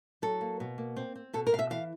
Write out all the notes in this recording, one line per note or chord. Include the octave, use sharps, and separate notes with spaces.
F#3 A4
A#3
B2
A#3
C4
C4
B2 A4
A#4
B2 F5
E5
E3 F5